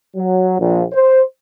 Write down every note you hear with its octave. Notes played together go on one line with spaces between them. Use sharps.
F#3
A#1
C5